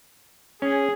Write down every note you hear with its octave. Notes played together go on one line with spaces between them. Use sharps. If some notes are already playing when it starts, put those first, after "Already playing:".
C#4 G#4